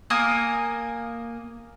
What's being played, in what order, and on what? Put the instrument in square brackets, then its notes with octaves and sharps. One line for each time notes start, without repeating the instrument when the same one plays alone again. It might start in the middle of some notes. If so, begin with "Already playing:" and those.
[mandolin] A#3 A#4 G#5 D#6